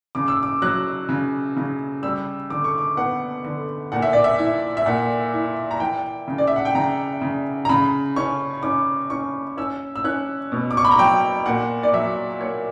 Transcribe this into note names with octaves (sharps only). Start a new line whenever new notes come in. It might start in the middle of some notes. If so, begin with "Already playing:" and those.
C#3 D6
E6
D6
F#3 F#6
C#3
C#3
G3 E6
D3 D6
C#6
D6
B3 F#5
D3
A#2 F#5
E5
D5
E5
E4
E5
A#2 F#5
E4
A#5
E3 G5
C#3
D5
E5
F#5
G5
C#3 A#5
C#3
A#5
C#3 B5
C#4 C#6
C#4 D6
C#4 C#6
C#4 E6
E6
C#4 F#6
B2
D6
C#6
B5
A#5
F#3 G5
A#2 F#5
D5
F#3 E5
A#3 C#5